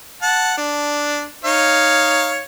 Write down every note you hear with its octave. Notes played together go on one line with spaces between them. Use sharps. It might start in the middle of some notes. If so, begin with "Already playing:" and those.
F#5 A5
D4
D#4 C#5 F5